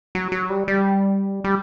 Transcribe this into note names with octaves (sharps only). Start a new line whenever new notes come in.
F#3
F#3
G3
G3
G3